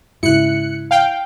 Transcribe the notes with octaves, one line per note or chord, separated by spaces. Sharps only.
G#2 C#3 E4 F#6 C#7
F5 G5